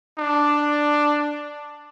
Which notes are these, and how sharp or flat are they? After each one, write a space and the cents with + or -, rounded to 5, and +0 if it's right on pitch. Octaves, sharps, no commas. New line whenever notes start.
D4 +5